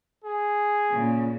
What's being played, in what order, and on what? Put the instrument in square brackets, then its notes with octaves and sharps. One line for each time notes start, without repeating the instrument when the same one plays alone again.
[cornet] G#4
[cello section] A#2 C#3